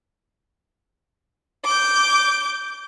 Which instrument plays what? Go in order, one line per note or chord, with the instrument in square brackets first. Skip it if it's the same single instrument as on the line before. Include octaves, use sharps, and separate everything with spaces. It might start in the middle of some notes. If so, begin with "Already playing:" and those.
[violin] D6 G6